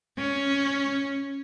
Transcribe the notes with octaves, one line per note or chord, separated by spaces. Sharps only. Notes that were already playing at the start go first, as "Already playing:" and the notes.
C#4